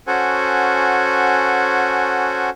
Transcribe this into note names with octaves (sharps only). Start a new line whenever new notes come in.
C#4 F#4 A4 C5 F#5 G#5